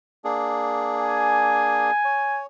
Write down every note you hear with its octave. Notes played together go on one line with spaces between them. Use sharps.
A#3 D4 G#4
G#5
C#5